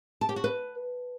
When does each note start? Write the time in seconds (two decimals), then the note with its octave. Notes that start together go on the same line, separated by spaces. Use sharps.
0.21 A5
0.29 G4
0.36 F#4
0.44 B4